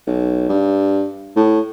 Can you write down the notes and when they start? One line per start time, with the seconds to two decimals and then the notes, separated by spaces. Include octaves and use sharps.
0.07 B1
0.49 G2
1.36 A2